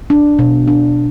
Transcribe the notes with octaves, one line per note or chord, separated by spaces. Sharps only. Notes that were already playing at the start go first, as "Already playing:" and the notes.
D4
B2
D4